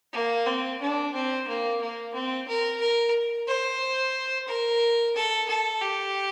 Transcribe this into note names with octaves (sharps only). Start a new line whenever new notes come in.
A#3
C4
D4
C4
A#3
A#3
C4
A#4
A#4
C5
A#4
A4
A4
G4